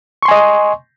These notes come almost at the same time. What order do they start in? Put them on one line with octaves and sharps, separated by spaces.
C#6 C6 G#5 D#5